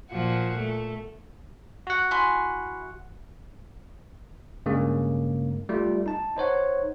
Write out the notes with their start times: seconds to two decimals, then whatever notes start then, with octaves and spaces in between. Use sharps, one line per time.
0.11 A#2 F3 F#4
0.58 A3
1.87 F#4 F#5
2.11 E4 G#5 C6
4.66 G2 C#3 G#3 A#3
5.69 G3 A3 F4
6.06 D#4 A5
6.37 D#4 C5 C#5 F#5